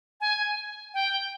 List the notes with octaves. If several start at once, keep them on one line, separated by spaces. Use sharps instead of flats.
G#5
G5